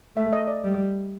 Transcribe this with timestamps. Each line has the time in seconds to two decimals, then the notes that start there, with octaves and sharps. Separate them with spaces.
0.16 A3 E5
0.33 D#5
0.47 D5
0.64 G3